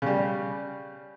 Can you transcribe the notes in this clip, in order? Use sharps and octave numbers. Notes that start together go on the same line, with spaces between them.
C#3 G3